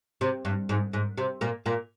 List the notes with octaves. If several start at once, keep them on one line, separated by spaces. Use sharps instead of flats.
C3
G2
G#2
G#2
C3
A#2 A#3
A#2 A#3